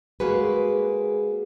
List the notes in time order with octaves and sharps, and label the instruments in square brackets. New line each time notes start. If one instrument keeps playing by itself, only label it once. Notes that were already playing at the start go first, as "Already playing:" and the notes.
[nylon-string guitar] G#3 A#3 F#4 G#4 B4